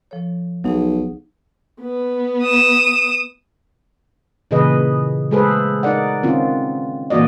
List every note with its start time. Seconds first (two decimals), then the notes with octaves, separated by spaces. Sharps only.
0.11 F3 A4 C#5
0.64 B1 F#3 D#4 G#4
1.81 B3
2.42 D#6 E7
4.51 A#2 C#3 E3 G#4 B4 D#5
5.31 G#3 A3 G#4 A4 B4 C5
5.83 D#4 A#4 D5 F#5
6.23 D#3 C4 C#4 F4
7.10 A#2 E3 A#3 F#4 D5 D#5